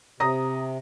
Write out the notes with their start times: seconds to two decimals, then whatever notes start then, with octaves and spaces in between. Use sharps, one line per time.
0.20 C3 A#5 D#6 A#6